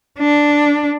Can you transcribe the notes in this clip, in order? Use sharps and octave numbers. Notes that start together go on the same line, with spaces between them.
D4